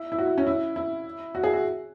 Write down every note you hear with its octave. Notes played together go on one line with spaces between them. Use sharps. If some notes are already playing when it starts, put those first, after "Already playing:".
Already playing: E4
E4
F#4
E4
C#4
E4
E4
F#4
G#4
F#4